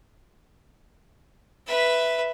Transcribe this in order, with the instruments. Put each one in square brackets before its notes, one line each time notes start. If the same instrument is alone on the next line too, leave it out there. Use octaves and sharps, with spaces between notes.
[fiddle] B4 E5